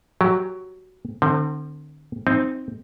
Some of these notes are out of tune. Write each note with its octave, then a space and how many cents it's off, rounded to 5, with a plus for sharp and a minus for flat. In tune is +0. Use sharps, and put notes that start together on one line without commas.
F#3 +5 G4 -5
D3 +35 C4 +0
C4 +0 D#4 +0